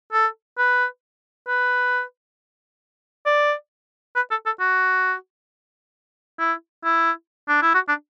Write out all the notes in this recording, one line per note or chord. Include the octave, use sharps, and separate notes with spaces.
A4
B4
B4
D5
B4
A4
A4
F#4
E4
E4
D4
E4
F#4
D4